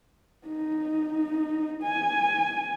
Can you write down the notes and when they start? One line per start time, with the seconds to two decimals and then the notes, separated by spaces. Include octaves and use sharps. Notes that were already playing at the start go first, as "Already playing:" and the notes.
0.47 D#4
1.83 G#5